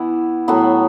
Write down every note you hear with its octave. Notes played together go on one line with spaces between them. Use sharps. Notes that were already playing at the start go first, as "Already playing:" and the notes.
Already playing: E3 B3 E4
A2 F#3 B3